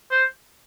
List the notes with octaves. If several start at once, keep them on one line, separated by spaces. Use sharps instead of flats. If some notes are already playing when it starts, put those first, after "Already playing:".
C5